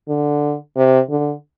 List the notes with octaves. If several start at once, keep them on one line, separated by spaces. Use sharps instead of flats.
D3
C3
D3